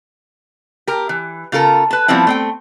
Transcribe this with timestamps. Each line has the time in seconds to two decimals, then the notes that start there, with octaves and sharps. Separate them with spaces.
0.87 G4 A#4
1.09 E3
1.52 C#3 F4 A4 A#4
1.91 B4 A5
2.08 F3 G3 B3 C4 E4
2.27 A3 C4 G5